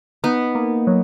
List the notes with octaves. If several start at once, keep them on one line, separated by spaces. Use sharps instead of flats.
B3 D#4
A#3
F#3